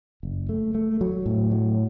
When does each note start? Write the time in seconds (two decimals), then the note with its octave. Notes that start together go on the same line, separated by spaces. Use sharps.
0.23 F#1
0.49 A3
0.75 A3
1.01 F#3
1.26 A2
1.51 F#3